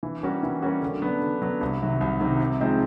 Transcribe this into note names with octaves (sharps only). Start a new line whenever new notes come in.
E3
G3 A#3 C#4 F#4
E3
G3 A#3 C#4 F#4
D3
F#3 B3 D4
D3
F#3 B3 D4
C2
C3 D#3 F#3
C2
C3 D#3 F#3
C3
F3 G#3 C4 D#4